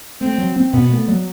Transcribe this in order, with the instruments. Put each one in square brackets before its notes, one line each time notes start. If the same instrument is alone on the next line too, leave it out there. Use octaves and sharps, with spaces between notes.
[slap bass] A3 [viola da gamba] C4
[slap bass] F#3
C4
[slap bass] B2 [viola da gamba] B3
[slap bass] A3
F#3